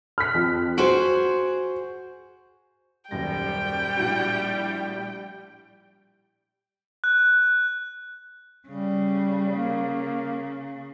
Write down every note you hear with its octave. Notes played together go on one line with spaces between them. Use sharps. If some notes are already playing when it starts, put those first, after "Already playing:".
F6 F#6 B6
F2
F#4 G#4 C5 D7
D#1 F#2 G3 G5 A#6
A#1 A2 F#4
F#6
C#3 G3
A#3